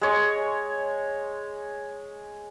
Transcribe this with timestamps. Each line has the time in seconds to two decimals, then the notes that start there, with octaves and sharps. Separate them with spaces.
0.01 G#3 C#5